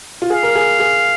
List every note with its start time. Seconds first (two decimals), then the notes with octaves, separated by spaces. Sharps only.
0.22 F4
0.30 G#4 F5
0.43 A#4
0.56 G#4
0.80 G#4